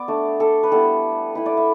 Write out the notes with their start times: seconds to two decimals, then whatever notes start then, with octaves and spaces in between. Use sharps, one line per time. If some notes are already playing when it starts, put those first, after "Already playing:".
Already playing: B3 D5
0.08 A3 D4
0.40 A4
0.63 B4
0.72 G3 B3 E4 A4
1.35 A3 E4 B4
1.46 D5
1.57 E5